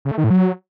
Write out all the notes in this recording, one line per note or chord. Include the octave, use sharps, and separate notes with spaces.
C#3
A3
D#3
A2
F#3